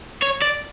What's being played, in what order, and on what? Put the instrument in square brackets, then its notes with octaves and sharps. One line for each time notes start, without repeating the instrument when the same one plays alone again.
[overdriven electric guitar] C#5
D5